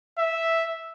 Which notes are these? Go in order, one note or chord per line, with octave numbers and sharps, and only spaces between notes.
E5